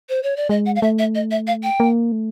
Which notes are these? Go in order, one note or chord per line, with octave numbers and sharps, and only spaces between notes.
C5
C#5
D5
G#3 D#5
F#5
F5
A3 E5
E5
D#5
E5
F5
G5
A#3
A3